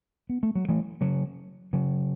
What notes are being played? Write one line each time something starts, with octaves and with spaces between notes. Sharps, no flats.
B3
A3
F#3
E3 A3
C#3 F#3
C#3 F#3